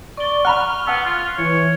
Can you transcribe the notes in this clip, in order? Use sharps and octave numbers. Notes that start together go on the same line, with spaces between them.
D5 C#6 G7
F#5 A#5 B5 F6 F#6
B3 F#5 A5 E6
F4
E3 C#5